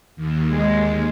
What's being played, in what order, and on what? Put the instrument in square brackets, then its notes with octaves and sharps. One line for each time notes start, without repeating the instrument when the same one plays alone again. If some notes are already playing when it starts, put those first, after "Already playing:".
[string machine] D#2
[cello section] G#3